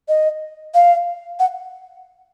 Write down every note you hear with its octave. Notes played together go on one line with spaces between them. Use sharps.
D#5
F5
F#5